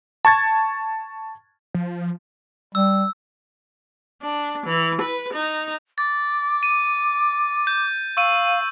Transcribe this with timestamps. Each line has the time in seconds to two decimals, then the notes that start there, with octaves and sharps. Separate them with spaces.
0.25 A5 C#6 G#6 A6
1.74 F3
2.75 G3 E6
4.22 D4
4.66 E3
5.02 B4
5.33 D#4
5.98 D6 A6
6.63 D#7
7.67 G6
8.17 F5 C#6 E6 D#7